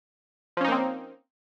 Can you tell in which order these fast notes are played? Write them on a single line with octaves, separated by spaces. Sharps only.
F3 C#4 D#4 A#3 C4